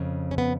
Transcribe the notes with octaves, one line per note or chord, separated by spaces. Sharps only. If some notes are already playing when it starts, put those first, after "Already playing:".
Already playing: F2 C#3
C#4
B3